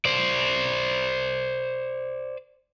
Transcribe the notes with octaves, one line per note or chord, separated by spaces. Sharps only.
C5 D5